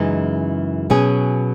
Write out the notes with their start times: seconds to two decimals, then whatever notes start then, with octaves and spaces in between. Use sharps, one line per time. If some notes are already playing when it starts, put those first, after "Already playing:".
Already playing: F#2 C#3 E3 G#3 D#4
0.90 B2 F#3 C#4 G#4